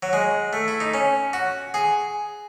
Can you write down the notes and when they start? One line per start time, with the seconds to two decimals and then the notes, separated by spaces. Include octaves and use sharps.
0.03 F#3
0.13 G#3
0.53 A3
0.68 E4
0.80 D#4
0.94 C#4
1.33 F#4
1.74 G#4